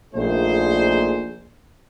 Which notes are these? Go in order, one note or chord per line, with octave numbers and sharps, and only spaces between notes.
A#1 A#2 A3 D#4 G#4 C5